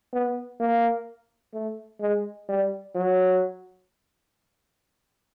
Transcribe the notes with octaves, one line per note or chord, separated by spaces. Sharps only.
B3
A#3
A3
G#3
G3
F#3